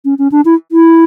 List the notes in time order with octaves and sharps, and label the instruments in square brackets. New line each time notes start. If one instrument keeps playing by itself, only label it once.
[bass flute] C#4
C#4
D4
E4
E4